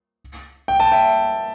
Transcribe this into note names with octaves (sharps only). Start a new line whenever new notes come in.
G5
A5
E5 G5